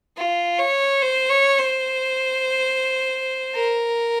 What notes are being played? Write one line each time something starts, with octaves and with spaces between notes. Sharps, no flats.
F4
C#5
C5
C#5
C5
A#4